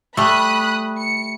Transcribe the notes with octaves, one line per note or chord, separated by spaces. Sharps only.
G3 A3 B5 D#6 F#6
C#7